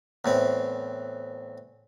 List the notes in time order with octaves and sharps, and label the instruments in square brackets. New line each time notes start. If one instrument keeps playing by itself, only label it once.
[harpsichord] E2 A2 C4